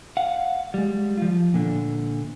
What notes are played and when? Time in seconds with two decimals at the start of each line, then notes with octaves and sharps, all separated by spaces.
0.17 F5 F#5
0.74 G3 G#3
1.17 F3 F4
1.54 A#2 D3